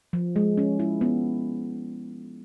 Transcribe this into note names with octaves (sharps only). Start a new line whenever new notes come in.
F3
G#3
C#4
E4
B3